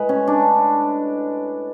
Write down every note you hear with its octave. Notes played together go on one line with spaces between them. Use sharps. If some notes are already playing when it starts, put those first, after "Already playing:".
Already playing: A2 G#3 B4
C#4
D4